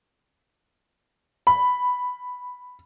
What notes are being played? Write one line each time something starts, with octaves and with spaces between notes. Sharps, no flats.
B5